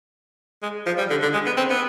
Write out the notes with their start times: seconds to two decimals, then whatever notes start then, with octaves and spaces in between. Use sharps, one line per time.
0.63 G#3
0.86 F3
0.98 G3
1.10 D3
1.22 D3
1.33 G#3
1.46 B3
1.57 C4
1.70 B3